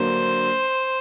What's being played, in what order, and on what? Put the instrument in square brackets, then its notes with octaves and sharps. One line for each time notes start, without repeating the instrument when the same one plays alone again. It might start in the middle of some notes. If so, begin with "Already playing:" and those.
Already playing: [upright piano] D3 F#3 A#3 D4 [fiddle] C5